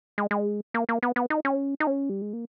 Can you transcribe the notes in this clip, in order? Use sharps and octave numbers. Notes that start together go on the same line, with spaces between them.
G#3
G#3
A#3
A#3
B3
B3
D#4
C#4
D#4
C#4
G3
G#3
A#3